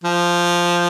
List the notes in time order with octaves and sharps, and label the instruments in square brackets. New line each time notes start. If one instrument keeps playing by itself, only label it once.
[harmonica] F3